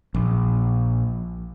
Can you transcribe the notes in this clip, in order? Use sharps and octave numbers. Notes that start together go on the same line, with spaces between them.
A#1